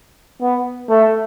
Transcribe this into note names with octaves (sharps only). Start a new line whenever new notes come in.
B3
A3